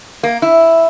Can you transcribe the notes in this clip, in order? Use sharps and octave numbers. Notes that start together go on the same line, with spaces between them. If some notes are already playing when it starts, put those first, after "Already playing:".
A#3
E4